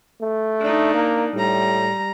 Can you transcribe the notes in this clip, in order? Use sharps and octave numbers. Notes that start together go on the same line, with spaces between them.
A3
D4 D#4
A#3
A2 G3 A#5